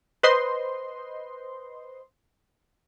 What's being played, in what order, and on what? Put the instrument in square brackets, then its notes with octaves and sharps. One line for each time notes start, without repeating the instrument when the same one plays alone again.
[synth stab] B4 C5 D#5 C6